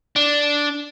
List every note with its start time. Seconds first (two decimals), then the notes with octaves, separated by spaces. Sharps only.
0.16 D4